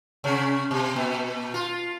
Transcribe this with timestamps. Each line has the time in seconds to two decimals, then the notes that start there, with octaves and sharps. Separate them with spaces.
0.24 C3 C#4
0.71 B2
0.96 A#2
1.54 F4